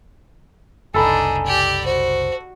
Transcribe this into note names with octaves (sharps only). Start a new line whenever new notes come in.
F#1 C2 D4 D#4 A4 G#5 B5
G4 D5
F#4 C5